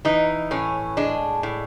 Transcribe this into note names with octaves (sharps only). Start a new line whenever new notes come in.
E3 D#4
A2 C#4
G#3 D4
A2